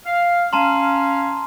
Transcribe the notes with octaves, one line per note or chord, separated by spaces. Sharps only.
F5
C#4 F5 A5 A#5 C6